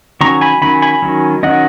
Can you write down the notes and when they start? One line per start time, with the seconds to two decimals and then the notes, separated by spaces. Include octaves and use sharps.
0.21 D#3 F#3 C#4 A#5 C#6
0.41 G#5 B5
0.62 D#3 F#3 C#4 G#5 B5
0.82 G#5 B5
1.02 D#3 F#3 C#4
1.43 D#3 F#3 C#4 D#5 F#5